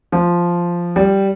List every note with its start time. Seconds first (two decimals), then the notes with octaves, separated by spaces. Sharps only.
0.12 F3
0.96 G3